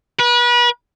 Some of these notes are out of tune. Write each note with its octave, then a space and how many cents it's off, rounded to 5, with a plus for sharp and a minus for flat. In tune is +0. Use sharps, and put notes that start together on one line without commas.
B4 -35